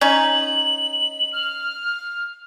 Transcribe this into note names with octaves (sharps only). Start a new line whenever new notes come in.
C#4 D#4 G#5 F#7
F6